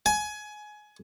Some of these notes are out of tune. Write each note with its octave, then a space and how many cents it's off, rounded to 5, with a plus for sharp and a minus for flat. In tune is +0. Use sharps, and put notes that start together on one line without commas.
G#5 +20